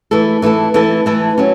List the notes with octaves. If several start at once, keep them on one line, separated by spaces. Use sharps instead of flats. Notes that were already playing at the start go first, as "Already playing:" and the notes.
E3 A3 E4 A4
E3 A3 E4 A4
E3 A3 E4 A4
E3 A3 E4 A4
F#3 C#4